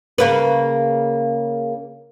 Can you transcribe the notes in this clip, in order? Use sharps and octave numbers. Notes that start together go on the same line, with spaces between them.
C#3 A#3 B4